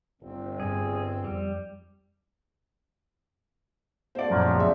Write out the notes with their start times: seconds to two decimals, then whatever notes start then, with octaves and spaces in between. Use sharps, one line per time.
0.22 G1 C4
0.60 G2 C4 G#4
1.24 F2 G3
4.15 B2 A3 C#4 C5 D5
4.30 F#2 A#2 F3
4.46 C#2 G3 G#3
4.60 D3 D#4 E5